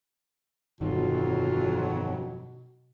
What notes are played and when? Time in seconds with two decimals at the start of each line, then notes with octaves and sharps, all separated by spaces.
0.81 G1 F2 B2 D#3 F#3 F4